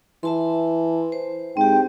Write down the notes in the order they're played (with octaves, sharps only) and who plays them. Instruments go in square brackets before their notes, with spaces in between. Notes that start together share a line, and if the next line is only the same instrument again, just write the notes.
[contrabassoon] E3 [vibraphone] E5 A5 C6
[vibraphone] C5
[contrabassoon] G#2 [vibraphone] C4 G4 [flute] G5